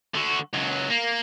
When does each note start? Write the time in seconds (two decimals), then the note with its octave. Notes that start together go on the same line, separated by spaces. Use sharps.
0.14 D3 F#4
0.53 C#2 F#3
0.90 A#3